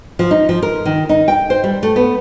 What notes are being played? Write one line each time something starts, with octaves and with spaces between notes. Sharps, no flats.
F3
D#4
F3
A#4
D#3
D#4
G5
C5
G3
A3
B3